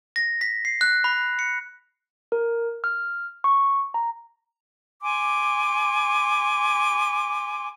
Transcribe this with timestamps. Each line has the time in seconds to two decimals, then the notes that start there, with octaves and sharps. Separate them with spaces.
0.16 A#6
0.41 B6
0.65 C7
0.81 F#6
1.04 B5
1.39 C#7
2.32 A#4
2.84 F6
3.44 C#6
3.94 A#5
5.02 G#5 C6 D6